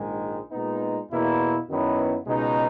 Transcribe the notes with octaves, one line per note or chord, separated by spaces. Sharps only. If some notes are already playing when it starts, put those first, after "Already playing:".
Already playing: A#1 G#2 D#3 G#3
A#2 G#3 B3 D#4
E2 B2 A#3 E4
F#2 D#3 F#3 B3 E4
C#2 B2 G#3 D#4